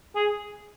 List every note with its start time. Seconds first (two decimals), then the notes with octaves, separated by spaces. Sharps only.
0.16 G#4